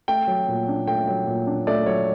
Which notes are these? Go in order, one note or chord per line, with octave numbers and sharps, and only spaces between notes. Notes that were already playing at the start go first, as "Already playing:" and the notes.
A3 G5
F#3
A#2
D4
A3 G5
F#3
A#2
D4
A3 D5
F#3 C#5